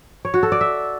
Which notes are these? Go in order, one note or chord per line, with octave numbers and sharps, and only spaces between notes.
C#5
F#4
A4
D5
E5